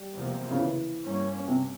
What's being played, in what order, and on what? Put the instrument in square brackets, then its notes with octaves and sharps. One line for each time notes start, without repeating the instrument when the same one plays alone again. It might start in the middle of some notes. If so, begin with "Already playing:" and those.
Already playing: [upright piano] G3
[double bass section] E2 C3 F3 A#3
[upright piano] C#3
E3
[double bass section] G2 G3 A#3 C#4
[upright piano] C3